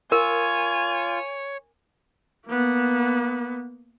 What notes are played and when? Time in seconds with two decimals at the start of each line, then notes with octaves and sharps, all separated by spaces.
0.12 F4 A#4 C#5 G#5
2.47 A#3 B3